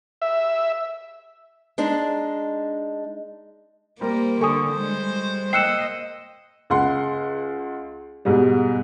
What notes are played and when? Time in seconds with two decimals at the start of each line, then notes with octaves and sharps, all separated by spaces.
0.22 E5
1.78 G#3 D4 D#4
4.01 G3 A#3 A#4 C5
4.41 D3 A4 G#5 C#6 D#6
4.72 G3 G#3 C5
5.53 A#3 D#5 G5 E6 F#6 C7 C#7 E7
6.70 C#2 F#5 C6
8.25 G#2 B2 G3